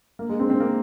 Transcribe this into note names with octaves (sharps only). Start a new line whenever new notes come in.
A#3
G#3
C4
C4
A#3